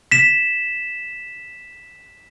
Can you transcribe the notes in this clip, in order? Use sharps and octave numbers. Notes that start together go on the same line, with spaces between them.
B6 E7